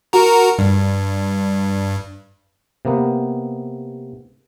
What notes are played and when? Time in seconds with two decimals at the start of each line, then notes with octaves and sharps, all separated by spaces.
0.13 F#4 A#4
0.58 G2
2.85 C3 A#3 B3